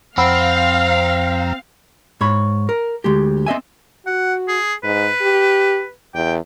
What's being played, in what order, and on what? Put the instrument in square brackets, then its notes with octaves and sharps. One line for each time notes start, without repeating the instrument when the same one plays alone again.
[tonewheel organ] F2 A#5 [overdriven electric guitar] C4 [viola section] F5 [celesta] F#5 B5 E6
[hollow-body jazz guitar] G#2 C#5 B5
A#4
D2 G#3 G4
C4 D#5 E5 G#5
[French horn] F#4 [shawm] F#5
[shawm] G#4
[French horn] G#2 [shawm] B4
[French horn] G4
[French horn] E2 [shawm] G5